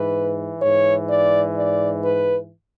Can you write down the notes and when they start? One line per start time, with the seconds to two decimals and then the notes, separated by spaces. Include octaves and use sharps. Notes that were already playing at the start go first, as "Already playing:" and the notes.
Already playing: G#2 E3 B4
0.61 G#2 E3 C#5
1.09 D5
1.56 D5
2.03 B4